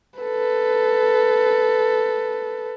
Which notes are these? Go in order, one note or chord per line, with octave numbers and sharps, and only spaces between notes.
A4 B4